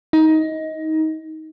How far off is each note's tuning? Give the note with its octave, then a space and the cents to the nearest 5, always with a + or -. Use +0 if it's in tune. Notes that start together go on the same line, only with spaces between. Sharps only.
D#4 +20